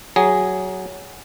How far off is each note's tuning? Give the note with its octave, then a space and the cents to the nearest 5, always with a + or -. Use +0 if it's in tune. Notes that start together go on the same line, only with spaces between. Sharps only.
F#3 +15 G#4 +0